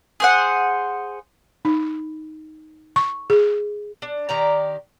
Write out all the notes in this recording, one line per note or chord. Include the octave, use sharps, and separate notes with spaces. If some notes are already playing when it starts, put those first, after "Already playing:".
G#4 C5 F#5
D#4
C#6
G#4
D4
D#3 G4 D5 A#5